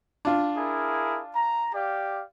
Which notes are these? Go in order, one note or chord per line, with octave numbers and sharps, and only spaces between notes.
D4 F4
E4 G#4 A#4
A#5
G4 D5 F5